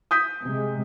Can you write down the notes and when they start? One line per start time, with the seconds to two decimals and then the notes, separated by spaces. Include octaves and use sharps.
0.11 D#6 G6 B6
0.43 C3 G#3